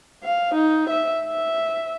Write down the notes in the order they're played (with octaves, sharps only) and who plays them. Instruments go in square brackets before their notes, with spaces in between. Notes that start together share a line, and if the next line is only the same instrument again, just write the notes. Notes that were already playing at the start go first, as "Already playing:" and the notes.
[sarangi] F5
D#4
E5
E5